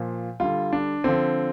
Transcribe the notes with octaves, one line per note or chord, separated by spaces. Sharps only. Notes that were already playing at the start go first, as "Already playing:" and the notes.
Already playing: A#2 F3
D3 G3 F4
D4
D3 F3 C4